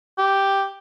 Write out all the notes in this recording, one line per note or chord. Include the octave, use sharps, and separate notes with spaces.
G4